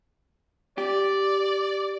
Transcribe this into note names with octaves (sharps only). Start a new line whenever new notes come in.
G4 D5